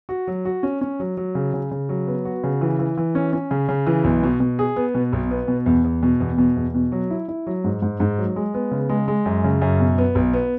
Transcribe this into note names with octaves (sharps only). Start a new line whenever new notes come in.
F#4
F#3
F#4
C#4
C#4
F#3
F#3
C#3
C#3
C#3
F#3
B3
F#4
C#3
E3
E3
E3
C#4
C#4
C#3
C#3
E3
B1
B2
B2
G#4
B3
B2
B1
B3
B2
E2
E2
B2
E2
B2
E2
B2
F#3
E4
E4
F#3
G#2
G#2
G#2
F#3
G#3
B3
C#3
G#3
G#3
F#2
C#3
F#2
B2
B3
B1
B3